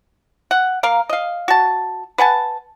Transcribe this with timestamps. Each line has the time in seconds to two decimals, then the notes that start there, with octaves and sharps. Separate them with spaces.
0.51 F#5
0.83 A#3 A#4 F5
1.10 D#5 F5
1.48 F#4 A5
2.18 B4 F#5 G#5 A5